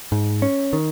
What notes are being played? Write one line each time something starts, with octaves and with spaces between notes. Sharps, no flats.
G#2
C#4
D#3